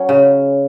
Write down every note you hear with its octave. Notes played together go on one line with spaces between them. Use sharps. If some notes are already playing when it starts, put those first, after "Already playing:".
Already playing: F#3 C#4
C#3